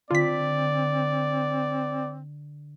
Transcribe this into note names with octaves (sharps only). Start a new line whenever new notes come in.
D3 C4 F4 D5 B6